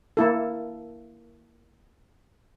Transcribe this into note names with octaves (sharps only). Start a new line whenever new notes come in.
A#3 E4 A4